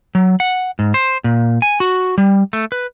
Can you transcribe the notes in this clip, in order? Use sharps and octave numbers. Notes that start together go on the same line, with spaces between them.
F#3
F#5
G#2
C5
A#2
G#5
F#4
G3
A3
B4